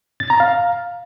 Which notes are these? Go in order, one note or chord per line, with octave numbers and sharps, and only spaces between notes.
A6
A#5
F5